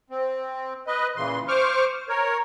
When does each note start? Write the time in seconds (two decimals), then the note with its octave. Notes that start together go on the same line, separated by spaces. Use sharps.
0.10 C4
0.87 B4 D#5
1.16 A#2 C#3 E3 C6
1.48 C5 C#6 D6 F6
2.09 A#4 C#5